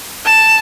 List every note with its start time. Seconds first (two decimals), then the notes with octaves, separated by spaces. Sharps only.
0.25 A5